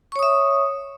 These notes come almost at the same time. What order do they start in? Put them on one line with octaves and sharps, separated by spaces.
C#6 C#5 D#6 E5